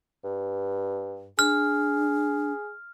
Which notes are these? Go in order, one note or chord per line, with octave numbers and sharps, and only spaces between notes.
G2
D4 G#4 F6